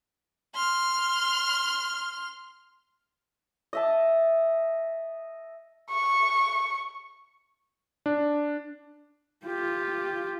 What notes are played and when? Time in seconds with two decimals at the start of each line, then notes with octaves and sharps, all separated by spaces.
0.55 C6 F6
3.73 D#5 E5 A5
5.90 C#6
8.06 D4
9.46 F4 G4